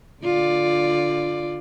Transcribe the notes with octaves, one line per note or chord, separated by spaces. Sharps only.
D3 F4 D5